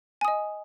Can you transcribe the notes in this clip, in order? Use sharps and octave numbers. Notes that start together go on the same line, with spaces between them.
D#5 G#5 D#6